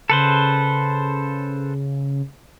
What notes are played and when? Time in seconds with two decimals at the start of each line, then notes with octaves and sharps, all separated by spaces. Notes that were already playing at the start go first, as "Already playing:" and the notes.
0.10 C#3 A4 B4 C5